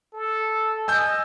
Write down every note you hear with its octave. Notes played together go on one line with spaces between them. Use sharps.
A4
D#5 G#5 E6 G6